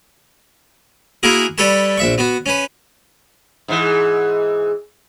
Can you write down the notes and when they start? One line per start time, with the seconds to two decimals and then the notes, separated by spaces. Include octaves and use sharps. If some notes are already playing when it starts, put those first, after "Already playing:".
1.23 A#3 E4 F#4 G#4 A#4
1.58 G3 A4 B4 C#5 A5
1.98 A#1 E5 C#6
2.18 B3 F#4
2.46 C#4 B4
3.68 G#2 E3